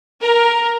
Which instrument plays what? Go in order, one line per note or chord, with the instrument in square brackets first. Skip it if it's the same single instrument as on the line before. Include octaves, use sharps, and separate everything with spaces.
[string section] A#4